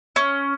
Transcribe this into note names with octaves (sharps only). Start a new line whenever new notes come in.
C#4